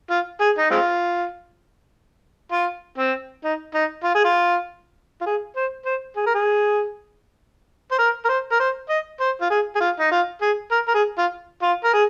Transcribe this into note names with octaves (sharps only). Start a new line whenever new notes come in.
F4
G#4
D#4
G#3 C4 F4
F4
C4
D#4
D#4
F4
G#4
F4
F4
G#4
C5
C5
G#4
A#4
G#4
C5
A#4
A#4
C5
A#4
C5
D#5
C5
F4
G#4
G#4
F4
D#4
F4
G#4
A#4
A#4
G#4
F4
F4
A#4
G#4